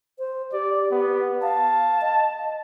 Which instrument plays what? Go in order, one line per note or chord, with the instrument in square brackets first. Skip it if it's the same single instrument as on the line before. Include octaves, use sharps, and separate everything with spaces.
[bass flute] C5
[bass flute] G4 [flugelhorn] D5
[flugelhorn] B3
[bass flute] F5 [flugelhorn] A5
[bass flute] D#5